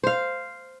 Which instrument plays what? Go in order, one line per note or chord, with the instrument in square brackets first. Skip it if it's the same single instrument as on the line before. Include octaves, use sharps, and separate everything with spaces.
[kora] C5 F5